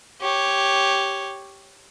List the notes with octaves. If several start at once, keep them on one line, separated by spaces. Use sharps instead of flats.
G4 C#5